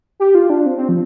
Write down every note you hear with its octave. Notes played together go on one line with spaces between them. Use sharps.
G4
F4
D4
C4
C4
F3